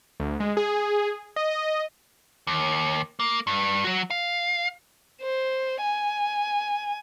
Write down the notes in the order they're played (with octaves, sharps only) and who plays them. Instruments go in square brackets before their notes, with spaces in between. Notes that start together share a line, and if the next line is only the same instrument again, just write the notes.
[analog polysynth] D2
G#3
G#4
D#5
D#5
[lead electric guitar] D#2
A#3
G2
F#3 F#4
F5
[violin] C5
G#5